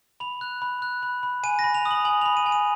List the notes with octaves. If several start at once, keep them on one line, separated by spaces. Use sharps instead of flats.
B5 F7
F#6
B5
F#6
B5
B5
G#5 D#7
A#6
B5
F7
D#6
F#7
G#5 F#7
B5 F7
D#7
G#5
D#7